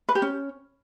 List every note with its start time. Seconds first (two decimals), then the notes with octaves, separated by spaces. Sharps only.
0.09 B4
0.15 G4
0.22 C#4